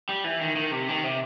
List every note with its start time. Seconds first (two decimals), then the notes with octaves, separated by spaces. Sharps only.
0.09 G3
0.24 E3
0.41 D#3
0.56 D#3
0.72 C3
0.88 D#3
1.04 C3